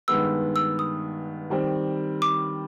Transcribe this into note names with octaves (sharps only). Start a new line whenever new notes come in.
G2 D#3 G#3 B3 E6
E6
D#6
D#3 G3 C4
D6